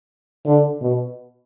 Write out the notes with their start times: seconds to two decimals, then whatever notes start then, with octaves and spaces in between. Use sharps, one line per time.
0.46 D3
0.81 B2